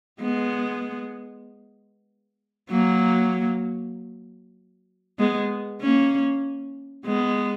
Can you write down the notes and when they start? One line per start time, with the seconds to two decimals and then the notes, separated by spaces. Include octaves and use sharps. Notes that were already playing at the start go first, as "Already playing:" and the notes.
0.21 G#3 B3
2.70 F#3 A#3
5.19 G#3 B3
5.82 A#3 C#4
7.06 G#3 B3